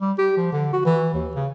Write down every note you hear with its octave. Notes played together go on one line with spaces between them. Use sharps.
G3
G4
F3
D3
F#4
E3
D#2
C#3